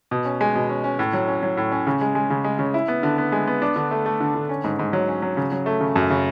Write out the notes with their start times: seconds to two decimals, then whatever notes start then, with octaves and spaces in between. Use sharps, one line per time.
0.11 B2
0.25 C#4
0.41 G#3
0.55 B2
0.69 C#4
0.84 C#4
0.99 A2
1.13 F#3
1.28 C#4
1.43 F#3
1.57 A2
1.72 C#4
1.87 C#3
2.01 G#3
2.15 G#3
2.30 C#3
2.44 G#3
2.59 C#3
2.74 E4
2.88 B3
3.03 D3
3.18 B3
3.32 G#3
3.47 B3
3.62 D4
3.76 D3
3.91 A3
4.06 A3
4.20 D3
4.35 D3
4.49 C#4
4.64 G#2
4.79 G#2
4.93 F#3
5.08 C#4
5.22 F#3
5.37 C#3
5.52 F#3
5.66 A3
5.81 C#3
5.96 F#2
6.10 C#3